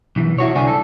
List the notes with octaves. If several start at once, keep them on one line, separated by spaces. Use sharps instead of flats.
B1 E3
E4 F#4 C#5
C2 D3 C5 D5 G#5
A4